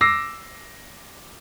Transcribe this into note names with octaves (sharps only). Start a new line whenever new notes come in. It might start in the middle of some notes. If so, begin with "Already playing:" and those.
D6 E6 A#6 C7